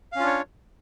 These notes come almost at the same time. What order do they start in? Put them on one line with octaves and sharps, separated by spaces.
F5 C#4 F4 D4 C#5